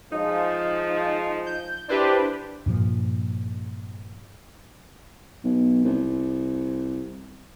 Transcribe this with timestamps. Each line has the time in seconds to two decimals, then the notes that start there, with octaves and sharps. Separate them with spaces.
0.12 F3 G#3 D#4
1.46 G6
1.89 D4 E4 G4 B4 C5
2.66 G2 A#2 F3
5.44 B1
5.84 C2